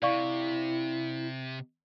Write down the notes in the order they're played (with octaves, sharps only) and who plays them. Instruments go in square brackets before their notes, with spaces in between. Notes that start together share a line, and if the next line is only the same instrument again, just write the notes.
[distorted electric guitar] C3 [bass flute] E4 [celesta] D5 F5 C#6